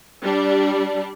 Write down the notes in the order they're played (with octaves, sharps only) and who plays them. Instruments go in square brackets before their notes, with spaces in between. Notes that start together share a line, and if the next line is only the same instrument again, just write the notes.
[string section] G3 D4